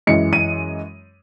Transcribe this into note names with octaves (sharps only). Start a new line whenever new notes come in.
F#2 E3 G#3 C#7
D#7